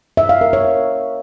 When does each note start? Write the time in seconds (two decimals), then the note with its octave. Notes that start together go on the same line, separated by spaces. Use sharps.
0.17 E5
0.29 F5
0.41 A#4
0.53 C#5